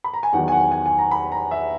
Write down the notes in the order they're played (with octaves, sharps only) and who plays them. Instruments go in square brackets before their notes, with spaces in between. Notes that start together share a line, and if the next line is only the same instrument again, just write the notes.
[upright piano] B5
A#5
G#5
E2 D#3 F#3 F#5
G#5
F#5
G#5
G#5
A#5
B5
A#5
E5